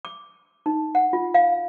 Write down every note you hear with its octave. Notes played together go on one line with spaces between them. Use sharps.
D6
D#4
F#5
F4
F5